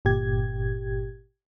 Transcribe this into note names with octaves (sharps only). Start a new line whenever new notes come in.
G1 A#2 G4 G#6